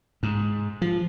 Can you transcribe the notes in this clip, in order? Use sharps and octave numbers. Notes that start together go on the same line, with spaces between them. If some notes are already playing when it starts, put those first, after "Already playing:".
G#2
F3